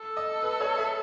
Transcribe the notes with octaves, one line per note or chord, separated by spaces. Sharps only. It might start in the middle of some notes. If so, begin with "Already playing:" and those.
Already playing: A4
D#5
B4
C#5
E5